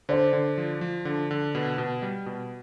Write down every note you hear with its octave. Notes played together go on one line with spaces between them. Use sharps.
D3 C5 D5
D3
F3
F3
D3
D3
B2
B2
G3
B2